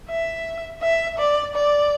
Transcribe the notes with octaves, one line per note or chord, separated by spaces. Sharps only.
E5
E5
D5
D5